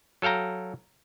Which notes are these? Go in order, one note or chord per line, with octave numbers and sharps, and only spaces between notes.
F#3 A4 F5 G5 A#5